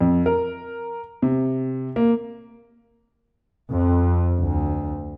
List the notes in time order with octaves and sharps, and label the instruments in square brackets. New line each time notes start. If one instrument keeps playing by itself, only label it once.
[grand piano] F2
A#4
C3
A#3
[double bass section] F2
D2